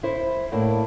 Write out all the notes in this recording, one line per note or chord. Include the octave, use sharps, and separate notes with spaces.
E4 C5
A2 A#3 D4 E4